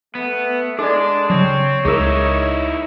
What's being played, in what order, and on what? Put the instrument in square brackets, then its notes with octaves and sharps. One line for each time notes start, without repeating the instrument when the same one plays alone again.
[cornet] A3 [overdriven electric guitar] B3
[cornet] G#3 [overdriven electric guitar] D4 [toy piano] A4 D5
[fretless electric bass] C#3 F#3 [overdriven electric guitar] C4 [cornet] C#5
[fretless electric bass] C#2 [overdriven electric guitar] D#4 E4 [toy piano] G#4 A#4